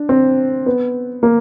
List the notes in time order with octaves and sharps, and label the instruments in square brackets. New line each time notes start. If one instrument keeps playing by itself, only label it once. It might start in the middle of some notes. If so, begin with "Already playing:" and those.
Already playing: [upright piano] D4
C4
B3
A#3